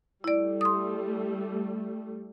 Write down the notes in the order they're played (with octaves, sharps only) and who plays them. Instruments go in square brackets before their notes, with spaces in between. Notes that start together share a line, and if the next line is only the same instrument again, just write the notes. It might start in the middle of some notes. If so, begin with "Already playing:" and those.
[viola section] G3 A3 [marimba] E4 D5
[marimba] C6 D#6